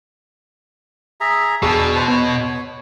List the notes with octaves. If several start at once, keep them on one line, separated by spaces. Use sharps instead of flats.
G#4 E5 A#5
E2 B2 D4 G#4 C#6 E6
B4 C5 A5
B3 C#5